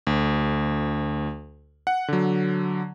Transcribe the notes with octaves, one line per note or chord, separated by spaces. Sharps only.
D2
F#5
D3 F#3